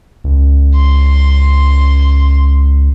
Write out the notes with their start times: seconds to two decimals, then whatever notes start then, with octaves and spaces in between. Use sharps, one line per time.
0.24 C#2
0.76 C6